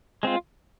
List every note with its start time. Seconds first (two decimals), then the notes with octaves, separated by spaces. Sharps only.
0.23 G#3 C4 F4